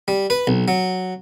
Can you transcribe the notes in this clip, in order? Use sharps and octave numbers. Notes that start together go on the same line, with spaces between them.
G3
B4
B1
F#3